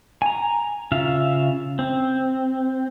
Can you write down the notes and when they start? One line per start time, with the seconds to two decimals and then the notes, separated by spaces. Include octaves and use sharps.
0.22 G#5 A#5
0.92 C#3 F4 E5 F5
1.79 C4